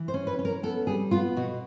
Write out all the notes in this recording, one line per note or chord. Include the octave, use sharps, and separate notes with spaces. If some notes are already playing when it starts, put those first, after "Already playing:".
Already playing: E3
C5
C#4
B4
C#4
A#4
B3 A4
G3 G#4
B3 F4
B2 F#4